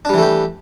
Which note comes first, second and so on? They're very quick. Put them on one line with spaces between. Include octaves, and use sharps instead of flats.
D4 G3 E3 A3 G4